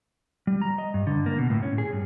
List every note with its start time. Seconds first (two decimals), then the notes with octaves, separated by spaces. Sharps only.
0.47 G3
0.62 A#5
0.78 D#5
0.94 G2
1.07 D3
1.26 A#3
1.38 B2
1.50 A2
1.63 C#4
1.78 G#4
1.92 G2